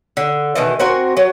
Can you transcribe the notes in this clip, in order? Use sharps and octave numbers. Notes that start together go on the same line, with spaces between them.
D3
B2 D#3 E3
C4 F#4 A#4 G#5
F#3